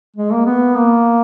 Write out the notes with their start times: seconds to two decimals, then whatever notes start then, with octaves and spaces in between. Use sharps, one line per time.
0.16 G#3
0.32 A#3
0.46 B3
0.76 A#3